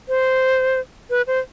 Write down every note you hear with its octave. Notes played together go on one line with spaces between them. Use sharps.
C5
B4
C5